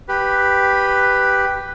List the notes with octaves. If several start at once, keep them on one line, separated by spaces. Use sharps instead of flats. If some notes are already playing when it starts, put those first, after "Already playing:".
G4 B4